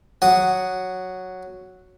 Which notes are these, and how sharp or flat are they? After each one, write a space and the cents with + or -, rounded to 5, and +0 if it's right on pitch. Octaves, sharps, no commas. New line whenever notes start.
F#3 +0 F#5 +0 D#6 +0